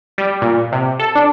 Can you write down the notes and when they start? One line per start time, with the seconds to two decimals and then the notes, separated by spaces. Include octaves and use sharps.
0.18 G3
0.42 A#2
0.72 C3
0.99 A4
1.15 D4